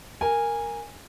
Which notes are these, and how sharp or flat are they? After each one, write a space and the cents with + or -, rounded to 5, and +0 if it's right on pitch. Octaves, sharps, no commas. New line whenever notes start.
A#4 -5 G#5 -15